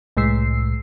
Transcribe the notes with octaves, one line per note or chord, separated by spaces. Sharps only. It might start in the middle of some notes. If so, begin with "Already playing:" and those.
C2 A2 G#3 E6 C7